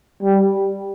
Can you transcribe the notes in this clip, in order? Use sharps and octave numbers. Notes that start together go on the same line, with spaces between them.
G3